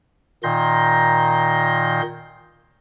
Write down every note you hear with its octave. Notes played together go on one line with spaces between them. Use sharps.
A#2 D#3 C6 G6 A#6